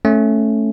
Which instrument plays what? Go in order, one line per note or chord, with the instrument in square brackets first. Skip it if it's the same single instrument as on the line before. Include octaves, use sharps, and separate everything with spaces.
[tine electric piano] A3 C#4